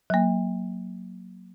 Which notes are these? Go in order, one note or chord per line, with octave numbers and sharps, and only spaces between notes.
F#3 A#3